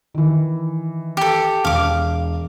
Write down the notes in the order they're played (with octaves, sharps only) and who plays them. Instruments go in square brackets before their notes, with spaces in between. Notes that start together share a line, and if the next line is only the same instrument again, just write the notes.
[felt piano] D#3 E3
[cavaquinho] G4 A4
[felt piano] E1 [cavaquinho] F5 D6